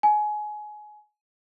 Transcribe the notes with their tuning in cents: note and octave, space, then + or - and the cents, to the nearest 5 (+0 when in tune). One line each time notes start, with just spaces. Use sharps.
G#5 +25